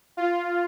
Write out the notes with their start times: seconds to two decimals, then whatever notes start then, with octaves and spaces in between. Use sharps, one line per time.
0.17 F4